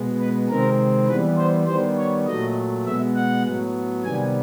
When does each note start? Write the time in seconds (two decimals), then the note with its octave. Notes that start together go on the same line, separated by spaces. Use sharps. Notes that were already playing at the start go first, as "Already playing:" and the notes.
Already playing: B2 G#3 B3
0.20 B4
0.49 C3 D#3 G#3 C4 A#4
1.08 E3 G3 B3 B4
1.37 C5
1.67 D#3 G3 B3 C5
1.97 C#5
2.27 A#2 F#3 A3 D#5
2.85 B2 G#3 B3 E5
3.16 F#5
3.45 A2 F#3 B3
4.04 C3 D#3 G3 B3 G#5